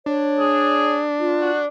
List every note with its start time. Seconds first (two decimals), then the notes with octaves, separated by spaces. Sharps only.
0.06 D4 C#5
0.39 G#4
1.20 F4
1.41 F#4